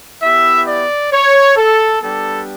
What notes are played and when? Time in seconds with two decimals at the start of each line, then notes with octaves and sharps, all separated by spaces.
0.22 B3 E4 G4 E5
0.67 D5
1.12 C#5
1.57 A4
2.02 G3 B3 D4 G4 A4